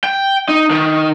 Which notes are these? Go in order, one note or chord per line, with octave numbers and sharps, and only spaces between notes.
G5
D#4
D#3